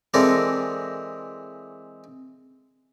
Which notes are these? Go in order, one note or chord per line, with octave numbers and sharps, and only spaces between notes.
E3 G#3 C4 A4 A#4 D5